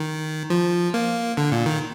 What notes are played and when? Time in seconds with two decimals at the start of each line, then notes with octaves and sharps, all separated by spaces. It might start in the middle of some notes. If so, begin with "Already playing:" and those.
Already playing: D#3
0.50 F3
0.94 A#3
1.37 D3
1.52 A#2
1.66 D#3